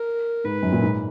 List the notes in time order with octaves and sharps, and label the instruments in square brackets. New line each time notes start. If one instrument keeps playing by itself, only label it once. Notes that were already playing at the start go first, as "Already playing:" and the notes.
Already playing: [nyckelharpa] A#4
[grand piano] G#2 [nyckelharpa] B4
[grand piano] F#2
A#2
G#2